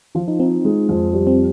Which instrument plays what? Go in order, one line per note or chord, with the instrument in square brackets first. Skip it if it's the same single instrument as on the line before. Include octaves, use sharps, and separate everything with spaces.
[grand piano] F3 [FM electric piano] F4
[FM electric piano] D#4
[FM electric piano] C4 [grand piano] D#4
[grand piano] G#3
F2
G3
[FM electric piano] C4